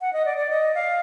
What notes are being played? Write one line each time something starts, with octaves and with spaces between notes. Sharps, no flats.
F#5
D#5
D5
D5
D#5
F5